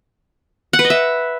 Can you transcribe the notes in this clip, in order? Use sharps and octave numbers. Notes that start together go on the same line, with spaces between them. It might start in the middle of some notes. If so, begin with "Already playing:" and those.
F#5
B4
D#5
E5